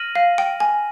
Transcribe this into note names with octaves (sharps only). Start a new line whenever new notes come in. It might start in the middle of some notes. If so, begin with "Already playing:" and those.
Already playing: F6 A#6 D#7 F#7
F5
G5
G#5